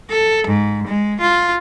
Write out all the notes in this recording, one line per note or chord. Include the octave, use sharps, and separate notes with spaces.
A4
G#2
G#3
F4